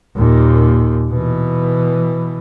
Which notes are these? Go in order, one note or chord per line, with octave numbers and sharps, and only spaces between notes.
D#2 A#2
B2 E3